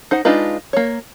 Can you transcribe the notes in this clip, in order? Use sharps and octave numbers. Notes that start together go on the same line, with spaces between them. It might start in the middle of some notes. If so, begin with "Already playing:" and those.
D#4 C5 F#5
G#3 D4 D#4 F4 B4
A#3 C#5